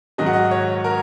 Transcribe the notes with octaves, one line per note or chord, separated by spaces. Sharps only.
G#2 D#3 F#3 D#5
F#5
D#5
C#5
A#4